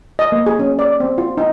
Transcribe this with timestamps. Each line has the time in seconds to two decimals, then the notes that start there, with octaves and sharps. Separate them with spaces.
0.19 D#5
0.32 A#3
0.46 G#4
0.59 C#4
0.79 D5
1.00 C4
1.18 F4
1.37 D#4